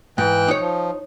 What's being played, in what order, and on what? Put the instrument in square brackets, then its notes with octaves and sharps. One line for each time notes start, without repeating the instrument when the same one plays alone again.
[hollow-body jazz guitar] G#2 [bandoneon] E3 G5 F#6
[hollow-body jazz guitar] D#4 C#5
[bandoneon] F3